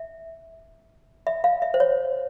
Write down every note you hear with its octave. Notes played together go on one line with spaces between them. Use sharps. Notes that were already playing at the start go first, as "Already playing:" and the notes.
Already playing: E5
E5
F5
E5
C5
C#5